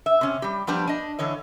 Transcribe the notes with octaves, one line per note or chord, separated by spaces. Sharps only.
E5
C3 C#4
G3 G4
F3 G3 B3 D4 G4
D4 D#5
D3 E3 C#5 D#5